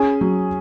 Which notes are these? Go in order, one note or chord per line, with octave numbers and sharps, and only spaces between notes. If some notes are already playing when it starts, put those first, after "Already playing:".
Already playing: C#4 G#4 G#5
F#3